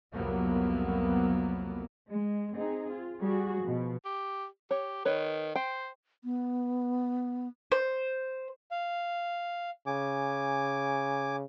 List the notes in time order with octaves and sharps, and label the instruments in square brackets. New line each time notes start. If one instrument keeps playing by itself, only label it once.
[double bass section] C2 F2 F#3 A#3 B3
[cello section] G#3
C4 D#4 G#4
F4
G3 F#4 G#4
B2 F3
[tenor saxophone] G4
[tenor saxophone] G4 [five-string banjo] C#5
[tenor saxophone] D#3 [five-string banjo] B4 C#5
[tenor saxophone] C5 [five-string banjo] G5
[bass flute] B3
[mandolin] C5
[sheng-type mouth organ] F5
[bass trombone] C#3 [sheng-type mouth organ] G#5 D6